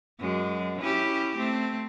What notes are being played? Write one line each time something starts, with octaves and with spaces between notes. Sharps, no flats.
F#2 G#3
C#4 E4 G4
A3 C4